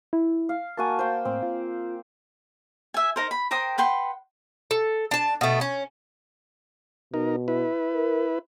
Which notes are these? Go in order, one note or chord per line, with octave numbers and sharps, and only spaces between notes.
E4
F5
A#3 F#4 G#5 A5
C5 F5 G5
A2 C4
F4
E5 G#5
D#4 A#4 C5
B5
A#4 C5 G5 D#6
B4 F#5 G5 C6
A4
D4 A5
B2 A3
C#4
B2 D#4 A#4
E4 B4
A#4